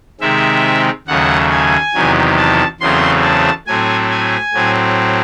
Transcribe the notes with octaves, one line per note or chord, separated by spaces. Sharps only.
C3 D#3 G#3 C4 E5
D#2 C#3 F#3 A3 F#5
G#5
E2 C3 D#3 F#3
A5
E2 C#3 F#3 A3 C4 C6
A5
A2 F#3 A3 C4 G#5
G#5
A2 F#3 C4